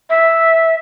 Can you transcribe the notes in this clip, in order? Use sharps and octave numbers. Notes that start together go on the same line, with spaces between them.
E5